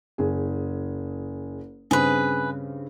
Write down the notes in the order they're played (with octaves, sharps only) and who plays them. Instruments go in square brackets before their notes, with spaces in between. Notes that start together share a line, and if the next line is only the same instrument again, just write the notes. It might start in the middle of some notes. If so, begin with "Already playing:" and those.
[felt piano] F#1 G#4
[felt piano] G2 C#3 C4 [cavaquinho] G#4 B4